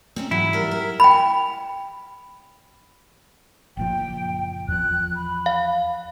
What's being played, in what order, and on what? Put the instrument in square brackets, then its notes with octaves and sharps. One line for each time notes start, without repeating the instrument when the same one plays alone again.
[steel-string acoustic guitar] C4 C#4 D#4
[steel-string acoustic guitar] G#2 E3 F#3 [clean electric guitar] E4
[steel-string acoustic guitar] G3 A#4
A#4
[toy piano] G5 B5
[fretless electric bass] F#1 A#2 F3 [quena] G5
[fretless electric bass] E2 F3 [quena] F#6
[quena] B5
[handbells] F5